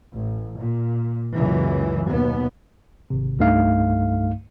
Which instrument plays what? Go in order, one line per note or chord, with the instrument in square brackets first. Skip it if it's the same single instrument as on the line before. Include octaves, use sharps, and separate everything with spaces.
[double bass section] A1
A#2
C#2 F#2 A#2 C#3 E3
D#2 B2 B3
[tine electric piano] G#1 C3
C2 G2 A3 D#4 F5